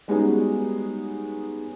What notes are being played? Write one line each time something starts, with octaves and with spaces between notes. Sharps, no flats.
G3 G#3 B3 C#4 D#4 F#4